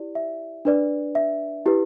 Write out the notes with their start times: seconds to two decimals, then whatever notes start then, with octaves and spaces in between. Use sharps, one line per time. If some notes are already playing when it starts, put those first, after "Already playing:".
Already playing: E4 G4 D5
0.15 E5
0.65 D4 B4 D5
1.15 E5
1.66 E4 G4 B4